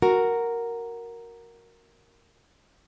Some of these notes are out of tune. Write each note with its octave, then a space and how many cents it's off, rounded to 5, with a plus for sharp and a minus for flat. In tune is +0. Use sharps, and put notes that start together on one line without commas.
F#4 +0 A#4 +0